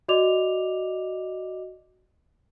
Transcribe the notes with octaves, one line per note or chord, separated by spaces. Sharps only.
F#4 D5 D#5 D6 F7